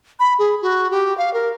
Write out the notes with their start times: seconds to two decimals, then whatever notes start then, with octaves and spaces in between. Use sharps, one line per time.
0.20 B5
0.39 G#4
0.62 F#4
0.91 G4
1.18 F5
1.34 A#4